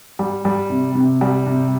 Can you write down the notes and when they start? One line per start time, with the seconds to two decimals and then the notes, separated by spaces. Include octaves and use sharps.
0.19 G3
0.45 G3
0.70 C3
0.95 C3
1.21 G3
1.47 C3